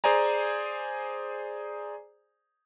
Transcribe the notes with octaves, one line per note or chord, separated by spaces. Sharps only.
G#4 C5 D5 G#5 A#5